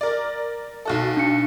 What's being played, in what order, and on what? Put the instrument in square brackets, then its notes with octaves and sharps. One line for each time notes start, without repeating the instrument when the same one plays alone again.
[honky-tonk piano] A#4 D5
B1 F#4 A4
[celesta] D4 C#7